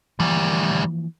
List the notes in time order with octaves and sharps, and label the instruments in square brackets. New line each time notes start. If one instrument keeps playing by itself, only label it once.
[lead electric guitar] D2 G3 [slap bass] E3 F3 A#3